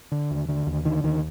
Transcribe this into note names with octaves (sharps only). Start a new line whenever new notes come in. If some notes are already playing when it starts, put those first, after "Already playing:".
D3
D#2
D3
D#2
D3 D#3
D#2 D#3